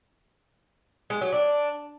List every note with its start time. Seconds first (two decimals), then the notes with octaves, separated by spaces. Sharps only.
1.10 G#3
1.21 F#3
1.32 D4